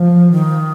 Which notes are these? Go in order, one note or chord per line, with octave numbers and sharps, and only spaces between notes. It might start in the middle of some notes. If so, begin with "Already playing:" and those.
Already playing: F3
D#3